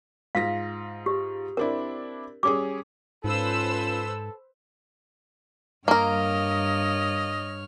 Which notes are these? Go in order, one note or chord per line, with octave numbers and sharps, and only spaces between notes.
G#2 F4 F5 A#6
G4
C4 D4 E4 A#4
G3 C#4 G#4 D6
G#2 C#4 F4 A4 B4 C5 E6
G2 A#3 A#4 C#5 D#5 F6